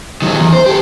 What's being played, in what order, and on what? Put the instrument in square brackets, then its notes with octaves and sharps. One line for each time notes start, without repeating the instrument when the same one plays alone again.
[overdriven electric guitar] D#3 F#3
E2
C5
G4 A4